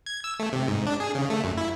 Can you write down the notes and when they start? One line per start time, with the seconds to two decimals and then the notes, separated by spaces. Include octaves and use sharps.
0.06 G#6
0.24 E6
0.39 A3
0.52 C3
0.68 G#2
0.87 D4
1.00 G#4
1.15 C#3
1.30 A3
1.44 F#2
1.58 E4